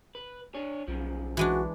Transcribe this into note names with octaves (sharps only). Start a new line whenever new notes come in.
B4
D4 C#5
B1 F#2 C#3 F3
E3 G#3 D4 F#4